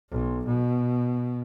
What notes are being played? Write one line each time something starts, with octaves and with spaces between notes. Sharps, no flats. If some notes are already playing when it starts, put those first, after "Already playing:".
B1
B2